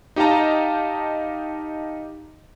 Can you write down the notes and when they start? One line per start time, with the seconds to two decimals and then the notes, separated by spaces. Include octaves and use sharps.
0.16 D#4 G4 D#5 F5 A5 A#5